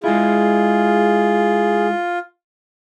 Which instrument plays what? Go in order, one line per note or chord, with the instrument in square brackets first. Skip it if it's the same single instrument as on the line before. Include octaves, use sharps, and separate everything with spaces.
[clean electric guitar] G#3 E4 [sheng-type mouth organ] F4 [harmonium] G#4